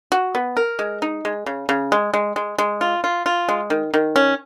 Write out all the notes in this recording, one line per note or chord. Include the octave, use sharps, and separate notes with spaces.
F#4
B3
A#4
G#3
D#4
G#3
C#3
C#3
G#3
G#3
G#3
G#3
F4
F4
F4
G#3
D#3
D#3
C#4